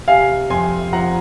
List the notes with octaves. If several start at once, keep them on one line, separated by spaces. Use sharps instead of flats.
C3 F5 G#5
F2 G#5 C6
F3 F#5 A#5